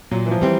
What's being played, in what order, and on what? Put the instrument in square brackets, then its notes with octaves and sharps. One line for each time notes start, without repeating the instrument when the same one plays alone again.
[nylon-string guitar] A#2 [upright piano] F#3
[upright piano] E3
F3
[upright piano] E3 [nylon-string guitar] G3 C4